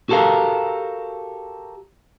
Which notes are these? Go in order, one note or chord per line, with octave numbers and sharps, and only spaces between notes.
F#4 G4 A4 A#4 F5